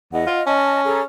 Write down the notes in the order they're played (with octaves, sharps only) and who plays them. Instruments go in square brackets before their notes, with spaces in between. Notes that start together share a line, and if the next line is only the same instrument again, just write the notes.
[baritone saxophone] E2 [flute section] D#5 F#5
[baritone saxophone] F4
[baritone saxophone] C#4 [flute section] D#5 A5
[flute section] G#4 A4 A#5